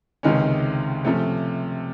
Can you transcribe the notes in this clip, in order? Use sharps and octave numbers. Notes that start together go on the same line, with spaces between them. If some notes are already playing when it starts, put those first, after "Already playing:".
C#2 C3 D#3 G#3 C#4
C3 F3 A3 C#4